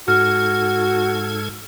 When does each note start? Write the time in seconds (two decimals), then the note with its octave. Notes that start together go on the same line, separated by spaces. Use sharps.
0.08 G#2 F#4 A4 F6 G#6